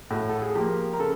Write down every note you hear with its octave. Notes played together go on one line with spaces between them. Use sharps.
A2 F#4
A4
G#4
F3 A#3 G4
A#4
C#3 A4